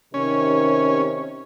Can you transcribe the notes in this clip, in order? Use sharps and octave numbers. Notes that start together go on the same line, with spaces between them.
C3 D#3 C#4